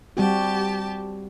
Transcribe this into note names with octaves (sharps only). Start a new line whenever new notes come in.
G3 C4 F#4 G4 A5